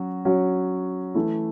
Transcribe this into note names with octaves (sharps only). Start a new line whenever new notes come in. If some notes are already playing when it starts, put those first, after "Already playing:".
Already playing: F#3 C#4 F#4
F#3 C#4 F#4
E3 A3 E4